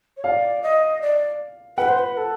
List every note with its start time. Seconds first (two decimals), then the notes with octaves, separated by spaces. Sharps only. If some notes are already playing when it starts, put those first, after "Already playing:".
0.17 C#5
0.24 D5 F5
0.63 D#5
1.02 D5
1.78 B4 F#5
1.89 C5
1.99 B4
2.17 A4